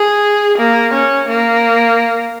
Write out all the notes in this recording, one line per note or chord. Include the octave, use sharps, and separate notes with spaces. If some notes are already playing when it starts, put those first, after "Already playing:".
Already playing: G#4
A#3
C#4
A#3